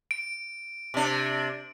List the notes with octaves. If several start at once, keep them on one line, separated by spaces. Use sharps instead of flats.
D7
C3 D4